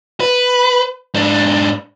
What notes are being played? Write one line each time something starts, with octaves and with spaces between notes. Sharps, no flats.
B4
G#2 D4